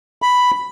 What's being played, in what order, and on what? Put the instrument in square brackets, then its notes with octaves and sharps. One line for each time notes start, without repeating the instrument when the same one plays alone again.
[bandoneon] B5